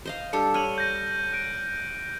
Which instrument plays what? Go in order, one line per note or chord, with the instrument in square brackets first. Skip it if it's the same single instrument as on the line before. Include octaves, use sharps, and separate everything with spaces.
[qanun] C5 D#5 F5
[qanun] G3 D4 A4 [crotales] C#7
[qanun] C#5 [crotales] F6 D#7 F#7
[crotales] G6 A#6 D#7
F#6 D7